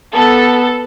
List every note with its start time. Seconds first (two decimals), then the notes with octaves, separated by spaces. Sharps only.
0.15 B3 A4